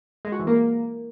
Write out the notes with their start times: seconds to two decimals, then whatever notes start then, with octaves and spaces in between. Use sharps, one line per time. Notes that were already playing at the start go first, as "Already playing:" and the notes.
0.25 G#3
0.32 F#4
0.40 E3
0.47 A#3